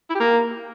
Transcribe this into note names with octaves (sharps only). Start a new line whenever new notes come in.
E4
G4
A#3